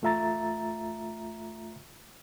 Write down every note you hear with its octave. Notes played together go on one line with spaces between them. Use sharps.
E2 A3 F4 E5 A#5 A6